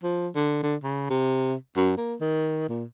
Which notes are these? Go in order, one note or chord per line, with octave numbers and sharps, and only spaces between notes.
F3
D3
D3
C#3
C3
F#2
A#3
D#3
A#2